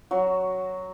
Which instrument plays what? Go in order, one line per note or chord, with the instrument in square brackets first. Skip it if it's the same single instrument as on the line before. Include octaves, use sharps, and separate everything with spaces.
[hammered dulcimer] F#3 F#4